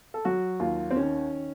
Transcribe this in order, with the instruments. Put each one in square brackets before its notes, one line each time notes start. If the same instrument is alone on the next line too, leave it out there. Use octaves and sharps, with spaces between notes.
[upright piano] A4
F#3 F#4
D#2 F4
C4
D#3 C#4